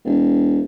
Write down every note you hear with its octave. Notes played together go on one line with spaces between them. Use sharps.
E1